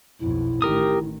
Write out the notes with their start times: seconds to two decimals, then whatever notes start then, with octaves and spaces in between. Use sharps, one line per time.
0.20 B1 F2 E4
0.62 A1 D#3 G4 A#4 D#6